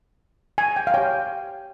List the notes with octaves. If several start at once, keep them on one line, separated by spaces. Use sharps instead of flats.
G#5
G5
F5
G4 C#5 G5